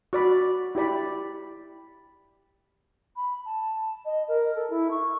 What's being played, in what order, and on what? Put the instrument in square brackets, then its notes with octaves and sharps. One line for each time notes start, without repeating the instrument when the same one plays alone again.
[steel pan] F#4 D5 B5
E4 G4 D5 B5
[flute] B5
A5
D#5
A#4
A4
E4
C#6